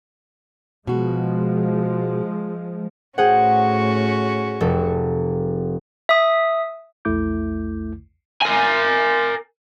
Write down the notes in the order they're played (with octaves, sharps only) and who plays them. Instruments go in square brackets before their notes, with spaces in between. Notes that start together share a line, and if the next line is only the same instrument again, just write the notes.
[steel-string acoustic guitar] B2 F#4 [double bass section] F3 G#3
[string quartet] A2 C#4 F#4 [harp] G#4 C5 F#5
[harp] F1 A4
[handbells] E5 D#6
[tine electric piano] A#1 E2 A3 E4 D6 G6
[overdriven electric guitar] A#4 G#5